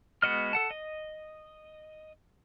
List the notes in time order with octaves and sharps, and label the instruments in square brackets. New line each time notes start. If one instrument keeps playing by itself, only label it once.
[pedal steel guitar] G#3 B3 F#4 D#5 F6
A4 F#5 A5
D#5